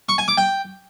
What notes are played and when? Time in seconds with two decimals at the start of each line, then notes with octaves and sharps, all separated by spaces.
0.09 C#6
0.18 G#5
0.28 D6
0.38 G5